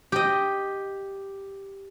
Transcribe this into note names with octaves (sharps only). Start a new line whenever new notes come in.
G4 D#5